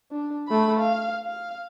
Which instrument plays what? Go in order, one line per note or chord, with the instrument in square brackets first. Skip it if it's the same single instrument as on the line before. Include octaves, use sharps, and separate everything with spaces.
[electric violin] D4
A3 B5
F5
F5